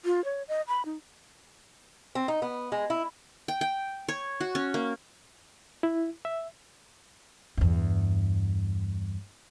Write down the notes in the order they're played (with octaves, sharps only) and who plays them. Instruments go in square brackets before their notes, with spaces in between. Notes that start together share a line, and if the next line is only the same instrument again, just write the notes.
[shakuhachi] F4
C#5
D#5
B5
D#4
[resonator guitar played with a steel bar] C4
D#4
B3
G#3
E4
[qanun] G5
G5
C#5
F#4
C#4
A#3
[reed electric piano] E4
E5
[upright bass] E2 G2